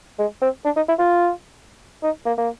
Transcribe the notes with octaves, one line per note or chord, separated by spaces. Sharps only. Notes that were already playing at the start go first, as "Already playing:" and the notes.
G#3
C4
D4
D#4
E4
F4
D#4
A#3
A#3